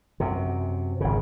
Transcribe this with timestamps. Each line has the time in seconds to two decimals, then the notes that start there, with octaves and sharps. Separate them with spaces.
0.20 F#2 C3
1.01 G#1 C#3